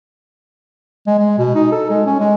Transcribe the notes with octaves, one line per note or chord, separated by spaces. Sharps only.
G#3
G#3
B2
D#4
A4
G#3
C#4
G#3